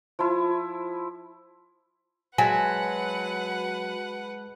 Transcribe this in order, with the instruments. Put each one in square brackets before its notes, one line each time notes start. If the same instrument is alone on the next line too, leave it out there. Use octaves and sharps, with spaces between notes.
[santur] F3 E4
[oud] F#3 [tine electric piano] G#3 A5 B6 [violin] B4 F#5 [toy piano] G#5